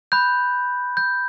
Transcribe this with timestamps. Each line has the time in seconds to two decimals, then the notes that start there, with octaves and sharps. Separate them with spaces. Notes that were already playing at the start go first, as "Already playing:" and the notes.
0.12 B5 F#6 G6
0.97 G6